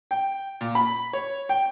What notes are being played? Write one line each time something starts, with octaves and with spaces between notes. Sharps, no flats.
G5
A#2
B5
C#5
G5